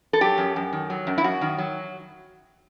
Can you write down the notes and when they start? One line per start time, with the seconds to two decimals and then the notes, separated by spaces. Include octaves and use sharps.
0.13 A4
0.21 F#3 G4
0.38 F#2
0.56 F#2
0.73 D#3
0.90 F#3
1.07 F#2
1.18 E4
1.24 F#2 F#4
1.41 D#3
1.58 F#3